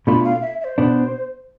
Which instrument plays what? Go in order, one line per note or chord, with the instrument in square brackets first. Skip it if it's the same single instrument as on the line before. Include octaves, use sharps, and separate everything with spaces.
[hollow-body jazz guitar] B2 A3 D4 F4 [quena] B5
[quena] F5
E5
E5
C5
[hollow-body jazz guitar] B2 B3 D4